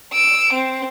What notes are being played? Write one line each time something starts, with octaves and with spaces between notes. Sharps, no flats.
E6 D7
C4